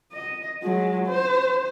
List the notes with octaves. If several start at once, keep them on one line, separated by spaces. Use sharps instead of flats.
D#5
F#3 G#3
C5